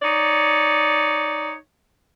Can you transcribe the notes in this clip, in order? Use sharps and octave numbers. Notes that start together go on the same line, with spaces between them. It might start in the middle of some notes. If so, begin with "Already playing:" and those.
D#4 C#5 D5